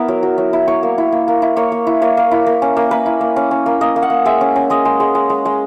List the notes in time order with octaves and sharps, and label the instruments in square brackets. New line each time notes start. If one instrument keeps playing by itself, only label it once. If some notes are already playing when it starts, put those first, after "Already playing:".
Already playing: [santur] B3 E4 A#4
F#3
F#3
F#3
E4
E4 C#5
A#3
E4
A#3
A#3
E4
A#3 C#5
A#3
E4
A#3 C#5
A#3
E4
A#3
C#4
A#3
A#3 B4
E4
A#3
C#4
C#4
A#3
A#3 D#5
A#3
F#5
A#3
G#3 E5
C#4
C#4
G#3 D#5
G#3
G#3
G#3
G#3
G#3